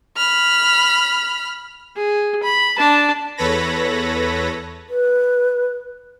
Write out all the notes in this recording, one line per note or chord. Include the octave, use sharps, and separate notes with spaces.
B5 F6
G#4
B5
D4 A5
E2 A4 B4 C#5 B5 A#6
B4